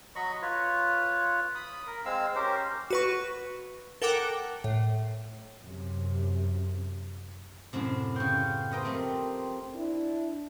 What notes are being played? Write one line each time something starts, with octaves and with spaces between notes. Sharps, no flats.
F#3 D#5 B5 C#6
F4 B4 C#5
B5 D#6
A#4
G#3 C4 F5 E6
C#4 G4 A#4 C5
F#4 B4 C#6
A4 A#4 F#5 G5 D6 F#6
A2
F#2 C3
F#2 A2 C3
C#3 G5 C6 C#6
B3 G4 A#4 C5 D#5 G5
F2 A3 C4
D4 E4